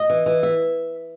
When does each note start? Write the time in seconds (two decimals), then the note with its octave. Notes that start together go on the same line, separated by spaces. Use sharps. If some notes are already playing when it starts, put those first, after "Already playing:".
Already playing: D#5
0.10 E3
0.26 E3
0.43 E5